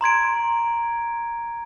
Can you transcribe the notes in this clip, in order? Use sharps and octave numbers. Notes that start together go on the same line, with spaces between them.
A#5 C6 G#6 D7